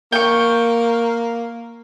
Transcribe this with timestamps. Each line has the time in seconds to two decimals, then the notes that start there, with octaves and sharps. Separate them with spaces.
0.12 A#3 G5 C#6